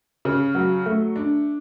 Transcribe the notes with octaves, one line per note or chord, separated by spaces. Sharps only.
C#3
F#3
A3
D4